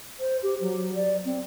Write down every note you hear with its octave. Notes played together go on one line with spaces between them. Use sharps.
C5
G4
F#3
D5
C4